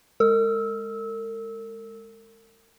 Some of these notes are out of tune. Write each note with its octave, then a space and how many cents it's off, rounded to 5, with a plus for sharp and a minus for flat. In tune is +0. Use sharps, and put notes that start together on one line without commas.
G#3 +0 A#4 -45 E6 -25